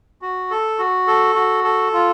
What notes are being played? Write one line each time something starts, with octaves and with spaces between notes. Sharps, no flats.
F#4
A4
F#4
A4
F#4
A4
F4